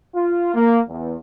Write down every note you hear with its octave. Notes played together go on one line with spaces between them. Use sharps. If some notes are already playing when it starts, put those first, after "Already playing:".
F4
A#3
E2